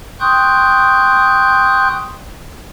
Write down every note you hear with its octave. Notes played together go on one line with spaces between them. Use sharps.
G5 C6 C#6 D#6 F#6 G6